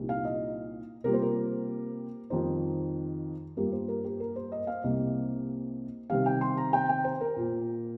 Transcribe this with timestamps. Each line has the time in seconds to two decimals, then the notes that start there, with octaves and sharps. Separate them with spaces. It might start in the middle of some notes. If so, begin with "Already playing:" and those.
Already playing: C2 A#2 F3 A#3 D#4
0.09 F5
0.25 D#5
1.04 C3 G3 A#3 F4 A#4
1.13 C5
1.22 A#4
2.30 F2 D#3 G3 D#4 C5
3.57 G2 G3 A#3 F4 A#4
3.72 C5
3.88 A#4
4.04 G4
4.20 A#4
4.36 C5
4.52 D#5
4.67 F5
4.83 C2 C3 G3 A#3 D#5
6.10 C3 D#3 G3 F5
6.26 G5
6.41 C6
6.57 A#5
6.73 G5
6.89 G5
7.04 C5
7.21 A#4
7.36 A#2 A#3 F4